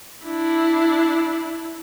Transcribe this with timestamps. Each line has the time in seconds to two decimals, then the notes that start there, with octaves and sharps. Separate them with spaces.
0.24 D4 E4